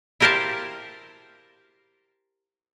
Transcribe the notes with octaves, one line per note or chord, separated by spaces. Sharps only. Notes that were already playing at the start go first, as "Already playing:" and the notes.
E4 G4 A#4 C5 F5 A5